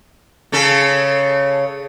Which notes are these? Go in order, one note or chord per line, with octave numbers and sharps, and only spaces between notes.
C#3 C#4 A4